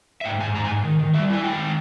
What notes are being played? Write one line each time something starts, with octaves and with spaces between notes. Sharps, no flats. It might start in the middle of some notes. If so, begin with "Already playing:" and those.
E5
G#2 G5
G#2 G#5
G#2 A#5
G#5
G#2
D#3
D#3
G3 E5
E4 G#5
G#3 G5
D#3